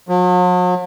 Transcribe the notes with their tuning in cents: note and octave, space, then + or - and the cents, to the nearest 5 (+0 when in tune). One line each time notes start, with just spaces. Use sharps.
F#3 -45